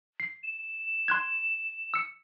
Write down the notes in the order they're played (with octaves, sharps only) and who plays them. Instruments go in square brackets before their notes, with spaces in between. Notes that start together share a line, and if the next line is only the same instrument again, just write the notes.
[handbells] C7
[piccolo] E7
[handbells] C6 F#6 G#6
E6 C#7